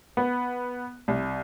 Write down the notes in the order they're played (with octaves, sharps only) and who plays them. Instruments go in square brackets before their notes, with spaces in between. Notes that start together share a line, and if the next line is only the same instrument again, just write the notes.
[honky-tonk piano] B3
C2